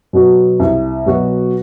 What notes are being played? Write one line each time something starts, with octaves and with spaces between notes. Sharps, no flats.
B2 F#3 B3 F#4
C2
B2 F#3 B3 F#4